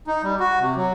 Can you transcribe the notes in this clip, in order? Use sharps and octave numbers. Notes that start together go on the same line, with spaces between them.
D#4
G3
F#4
C3
F#3